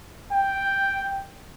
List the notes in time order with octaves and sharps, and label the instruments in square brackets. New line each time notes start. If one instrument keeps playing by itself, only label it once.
[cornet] G5